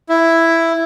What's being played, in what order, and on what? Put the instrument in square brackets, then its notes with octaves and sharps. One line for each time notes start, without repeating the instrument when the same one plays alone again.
[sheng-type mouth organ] E4